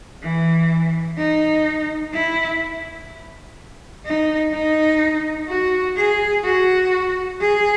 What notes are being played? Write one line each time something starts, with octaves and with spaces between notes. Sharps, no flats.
E3
D#4
E4
D#4
D#4
F#4
G#4
F#4
G#4